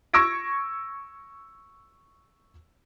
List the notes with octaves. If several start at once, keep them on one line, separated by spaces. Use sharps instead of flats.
C#6 E6 G#6 A#6 D7